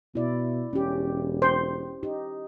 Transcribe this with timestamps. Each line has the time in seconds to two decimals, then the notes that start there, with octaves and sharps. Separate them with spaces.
0.15 B2 E4 D5
0.73 E1 C#4 G4
1.42 C5
2.03 D#4 G4